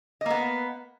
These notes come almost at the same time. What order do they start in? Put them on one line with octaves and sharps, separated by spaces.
D#5 A#3 B3